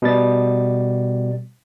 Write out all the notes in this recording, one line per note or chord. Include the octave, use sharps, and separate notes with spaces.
B2 G3 A6